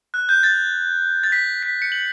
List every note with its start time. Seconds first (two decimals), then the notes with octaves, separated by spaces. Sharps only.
0.14 F#6
0.29 G6
0.43 A6
1.24 A6
1.32 B6
1.63 B6
1.82 C#7
1.92 F#7